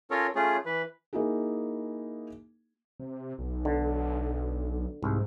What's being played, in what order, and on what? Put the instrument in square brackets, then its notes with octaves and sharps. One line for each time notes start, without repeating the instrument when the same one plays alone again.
[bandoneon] C#4 F4 A4 A#4 C#5
A3 C#4 F4 G#4
E3 B4
[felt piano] A#3 D#4 E4 F#4 G#4
[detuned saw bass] C3
B1
[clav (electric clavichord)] D3
[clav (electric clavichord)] C2 [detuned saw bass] G#2